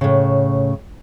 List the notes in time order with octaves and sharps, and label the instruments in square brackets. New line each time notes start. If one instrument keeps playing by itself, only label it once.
[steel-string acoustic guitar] A2 C#3